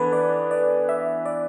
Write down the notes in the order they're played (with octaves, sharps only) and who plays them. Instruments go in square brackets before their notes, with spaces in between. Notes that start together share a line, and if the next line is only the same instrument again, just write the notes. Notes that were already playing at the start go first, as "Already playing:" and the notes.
Already playing: [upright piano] E3 B3 D4 [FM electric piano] A4 B4
[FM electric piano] D5
D5
E5
D5